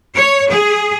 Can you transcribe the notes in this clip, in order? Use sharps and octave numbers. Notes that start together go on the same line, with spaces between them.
C#5
G#4